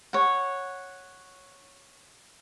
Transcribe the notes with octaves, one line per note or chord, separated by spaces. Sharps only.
C#5 F#5